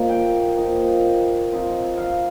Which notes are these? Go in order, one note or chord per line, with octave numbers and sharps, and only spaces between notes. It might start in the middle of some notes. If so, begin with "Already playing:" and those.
Already playing: A#2 F3 A#3 D#4
G5
F3 A#3 D#4
F3 C4 D#4
F5